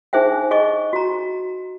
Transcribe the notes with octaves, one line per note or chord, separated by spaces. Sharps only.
D4 D#4 G#4 C5 E5 G5
G#4 D#5 C#6
F#4 A#5